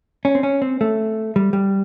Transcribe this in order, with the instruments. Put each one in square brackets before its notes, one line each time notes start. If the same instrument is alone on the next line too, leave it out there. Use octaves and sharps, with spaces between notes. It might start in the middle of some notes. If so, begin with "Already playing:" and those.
[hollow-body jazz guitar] C#4
C4
C#4
C4
A3
G3
G3